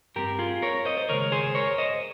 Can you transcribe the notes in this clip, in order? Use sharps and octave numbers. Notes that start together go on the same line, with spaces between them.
G2 G3 C4 G4 A#4
F4 G#4
A#4 C#5
C5 D#5
C5
D#2 C#3 G#3 A#4 C#5
G#4 C5
A#4 C#5
C5 D#5